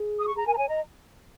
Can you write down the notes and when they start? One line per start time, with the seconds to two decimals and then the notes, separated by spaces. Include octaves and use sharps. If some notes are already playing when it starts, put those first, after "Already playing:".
Already playing: G#4
0.20 D#6
0.27 C#6
0.35 G#4 A#5
0.46 A#4 G#5
0.54 A#5
0.58 C#5 G#5
0.69 D#5 A#5